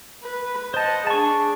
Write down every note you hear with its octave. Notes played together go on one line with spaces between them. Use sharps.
B4
C5 D#5 F#5 A5
D4 G#4 A5 C#6